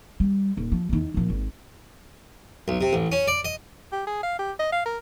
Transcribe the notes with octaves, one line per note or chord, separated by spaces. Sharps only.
G3
D#1
F3
E2 D#3
A#2 F3
G#1
B1
C3
A1
C#4
D5
D#5
G4
G#4
F5
G4
D#5
F5
A#4